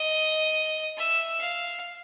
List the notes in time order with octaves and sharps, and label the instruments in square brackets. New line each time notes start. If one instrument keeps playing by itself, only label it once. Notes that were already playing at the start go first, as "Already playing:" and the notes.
Already playing: [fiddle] D#5
E5
F5